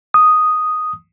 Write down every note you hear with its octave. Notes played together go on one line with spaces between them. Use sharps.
D#6